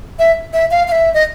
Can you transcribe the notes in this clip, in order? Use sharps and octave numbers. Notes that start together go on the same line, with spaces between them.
E5
E5
F5
F5
E5
D#5